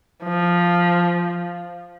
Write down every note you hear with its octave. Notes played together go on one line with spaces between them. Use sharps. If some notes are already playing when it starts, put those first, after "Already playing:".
F3